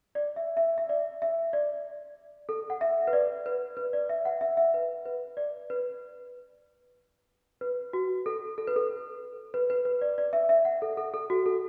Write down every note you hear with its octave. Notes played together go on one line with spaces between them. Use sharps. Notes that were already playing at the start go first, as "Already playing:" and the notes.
D5
E5
E5
E5
D5
E5
D5
A4
F#5
E5
B4
D5
B4
B4
D5
E5
F#5
E5
E5
B4
B4
D5
B4
B4
F#4
A4
A4
B4
A4
B4
B4
B4
D5
D5
E5
E5
F#5
A4
A4
A4
F#4
A4